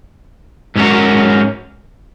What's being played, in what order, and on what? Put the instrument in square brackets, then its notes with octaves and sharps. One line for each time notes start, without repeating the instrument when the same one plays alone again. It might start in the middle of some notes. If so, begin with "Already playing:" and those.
[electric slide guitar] G#2 F#3 C#4 F#4 A#4